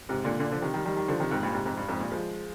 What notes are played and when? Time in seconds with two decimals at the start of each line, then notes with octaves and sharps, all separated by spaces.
0.09 G#2 C3
0.24 A#2 D3
0.39 A#2 D3
0.51 D3 F3
0.62 C3 D#3
0.74 D#3 G3
0.85 D#3 G3
0.97 D#3 G3
1.08 D3 F3
1.20 C3 D#3
1.31 F2 G#2
1.43 G2 A#2
1.54 G#2 C3
1.66 F2 G#2
1.77 G2
1.89 F2 G#2
2.00 G2 A#2
2.11 F3 G#3